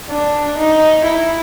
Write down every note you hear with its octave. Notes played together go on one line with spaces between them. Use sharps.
D4
D#4
E4